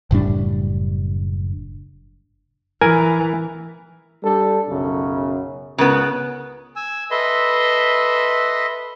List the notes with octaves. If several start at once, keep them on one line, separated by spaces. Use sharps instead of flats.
F#1 A2 G3 D4
E3 A#4 G#5
G3 D4 A4
B1 F#2 C#3
C#2 G#2 C#3 B3 A#4
G#5 E6
A4 B4 D#5 E5 C6